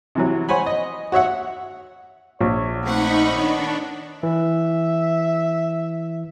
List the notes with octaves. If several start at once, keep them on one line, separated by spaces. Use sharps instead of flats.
C3 E3 F#3
C5 C#5 F#5 G#5 B5
D#5
F#4 C#5 E5 F#5
A#1 C#5
A3 B3 C4 D#4 F#5 B5 C#6
D#3 D4 C#5
E3 E5